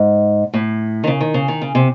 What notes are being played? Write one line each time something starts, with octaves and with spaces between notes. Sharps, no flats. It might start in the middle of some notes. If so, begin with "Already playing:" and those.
Already playing: G#2
A2
D#3
C#3
D#3
C#3
D#3
C#3
C3